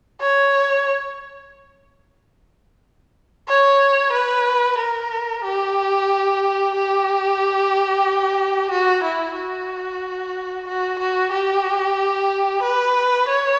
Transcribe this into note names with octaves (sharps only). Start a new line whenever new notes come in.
C#5
C#5
B4
A#4
G4
G4
F#4
E4
F#4
F#4
F#4
G4
B4
C#5